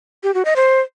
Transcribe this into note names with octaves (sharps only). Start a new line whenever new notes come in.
G4
F#4
D#5
C5